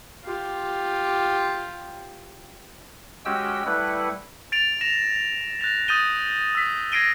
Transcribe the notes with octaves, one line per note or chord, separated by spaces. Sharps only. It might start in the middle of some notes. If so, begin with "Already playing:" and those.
F4 G4
G#3 C#4 F#4 G4 G5 E6
G3 A3 E4 B4 F#5
A6 D7 F7
A#6 E7 F7
F#6 A6 A#6 F7
D#6 G6 A6 D#7 G7
E6 B6
G#6 A#6 C7 D7 D#7 G7